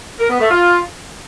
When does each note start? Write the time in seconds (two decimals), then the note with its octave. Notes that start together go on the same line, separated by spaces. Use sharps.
0.20 A#4
0.30 B3
0.40 A3
0.50 F4